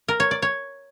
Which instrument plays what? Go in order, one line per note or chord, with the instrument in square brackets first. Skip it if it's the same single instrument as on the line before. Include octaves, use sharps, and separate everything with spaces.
[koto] A#4
C#5
D5
C#5